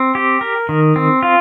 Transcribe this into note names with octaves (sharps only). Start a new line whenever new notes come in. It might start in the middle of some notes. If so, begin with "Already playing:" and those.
Already playing: C4
G4
A#4
D#3
C4
F4